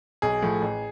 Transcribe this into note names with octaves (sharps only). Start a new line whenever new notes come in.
B1 G#4
A2 F3 A3
A1